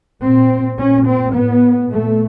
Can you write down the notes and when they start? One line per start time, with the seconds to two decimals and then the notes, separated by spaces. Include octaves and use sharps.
0.21 A#2 C4
0.78 A#2 C#4
1.06 C4
1.34 A2 B3
1.90 A#2 A3